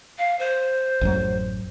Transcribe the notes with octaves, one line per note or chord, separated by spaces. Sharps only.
F5
C5
A1 F#2 F#3